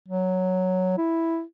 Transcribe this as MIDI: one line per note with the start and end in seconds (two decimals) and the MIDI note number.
0.08 0.95 54
0.97 1.42 64